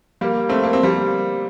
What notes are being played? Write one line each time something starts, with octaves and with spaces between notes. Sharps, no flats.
G3 A#3
A3 C4
A#3
C4
G3 A#3